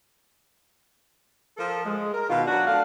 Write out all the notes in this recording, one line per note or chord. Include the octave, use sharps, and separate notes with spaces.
F3 A4 A#4
G#3
A#4
B2 D#3 F4
F#3 D4 F#4
A3 D4 F5